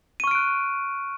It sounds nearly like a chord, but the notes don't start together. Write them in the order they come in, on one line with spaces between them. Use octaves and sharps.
D#7 C#6 F6 D7 F#6